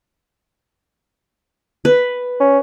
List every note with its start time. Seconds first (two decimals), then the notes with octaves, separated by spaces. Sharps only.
1.85 B4
2.40 C#4